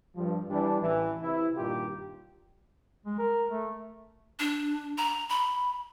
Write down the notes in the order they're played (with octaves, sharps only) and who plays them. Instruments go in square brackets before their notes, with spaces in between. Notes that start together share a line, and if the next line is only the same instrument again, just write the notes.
[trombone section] G2 F3
E3 G3 D4
A1 E3
C3 E3 E4
G2 A#2 D#3 F4 G4
[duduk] G#3
A#4
A3
[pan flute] D4
A#5
B5